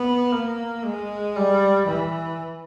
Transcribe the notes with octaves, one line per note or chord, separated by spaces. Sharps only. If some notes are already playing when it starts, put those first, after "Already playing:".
Already playing: B3
A#3
G#3
G3
E3